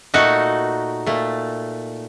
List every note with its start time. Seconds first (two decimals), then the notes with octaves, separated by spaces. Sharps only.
0.14 A#2 A3 D#4 F#4
1.06 A#2 A3